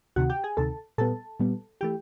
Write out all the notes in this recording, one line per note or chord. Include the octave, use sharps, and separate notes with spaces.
D2 C3 D#3 F#4 F#5
G4 G5
G#4 G#5
D2 C3 D#3 A4 A5
A#2 G3 B3 A4 A5
A#2 G3 B3
E3 A3 G4 G5